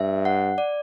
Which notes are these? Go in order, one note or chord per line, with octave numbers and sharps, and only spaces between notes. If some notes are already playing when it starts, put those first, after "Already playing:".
Already playing: G2 E5
F#5
D5